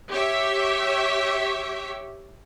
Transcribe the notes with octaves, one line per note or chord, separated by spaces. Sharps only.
G4 C#5 E5